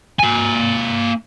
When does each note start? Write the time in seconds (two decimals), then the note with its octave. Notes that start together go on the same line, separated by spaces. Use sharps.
0.19 A#3 G#5